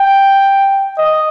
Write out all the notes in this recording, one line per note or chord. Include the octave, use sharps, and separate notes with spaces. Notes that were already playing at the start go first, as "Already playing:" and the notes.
Already playing: G5
D#5